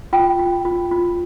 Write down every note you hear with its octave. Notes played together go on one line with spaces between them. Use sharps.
F4 G5
F4
F4
F4